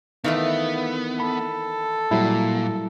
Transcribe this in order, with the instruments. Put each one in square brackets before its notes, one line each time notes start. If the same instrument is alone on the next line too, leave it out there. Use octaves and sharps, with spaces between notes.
[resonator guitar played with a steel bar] D#3 E3 A3 [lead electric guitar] B3 [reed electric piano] F5
[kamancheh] A4 [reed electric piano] B5
[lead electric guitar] A#2 [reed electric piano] F#3 G3 E4